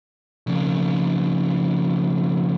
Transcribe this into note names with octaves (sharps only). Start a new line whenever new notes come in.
F2 C#3